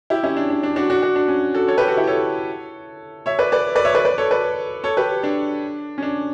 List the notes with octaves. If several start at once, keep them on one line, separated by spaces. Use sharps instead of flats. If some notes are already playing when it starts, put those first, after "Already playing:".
E4 G4
C#4 E4
D4
D4
D4
D4 F#4
D4 F#4
D4 F#4
D4
C#4
F#4 A4
A4 C#5
G4 B4
F#4 A4
E4 G4
A4 C#5
C#5 E5
B4 D5
B4 D5
B4 D5
C#5 E5
B4 D5
B4 D5
A4 C#5
B4 D5
A4 C#5
G4 B4
D4
C#4
D4